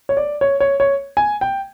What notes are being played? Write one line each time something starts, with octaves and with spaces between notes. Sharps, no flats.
C#5
D5
C#5
C#5
C#5
G#5
G5